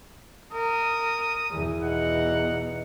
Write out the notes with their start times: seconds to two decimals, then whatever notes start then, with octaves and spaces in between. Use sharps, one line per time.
0.53 A#4 D#6
1.50 E2 B2
1.84 D#4 F#5